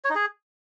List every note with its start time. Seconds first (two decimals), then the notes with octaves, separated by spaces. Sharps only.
0.05 C#5
0.10 D#4
0.15 G#4